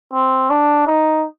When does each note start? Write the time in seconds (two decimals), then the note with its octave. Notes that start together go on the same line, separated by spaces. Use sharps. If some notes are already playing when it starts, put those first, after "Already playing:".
0.13 C4
0.50 D4
0.87 D#4